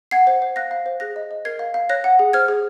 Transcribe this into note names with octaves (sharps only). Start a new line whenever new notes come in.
F#5 G#6 C7
C5
C5
F5 F#6 A#6
F5
C5
G#4 F#6 A#6
D#5
D#5
A#4 G#6 C7
F5
F5
C#5 F#6 A#6
F#5
G#4
C5 F6 G#6
G#4